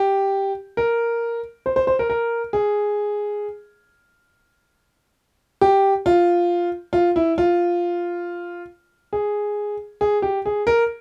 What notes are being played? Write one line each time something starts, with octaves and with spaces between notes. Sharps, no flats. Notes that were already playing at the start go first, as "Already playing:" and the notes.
Already playing: G4
A#4
C5
C5
C5
A#4
A#4
G#4
G4
F4
F4
E4
F4
G#4
G#4
G4
G#4
A#4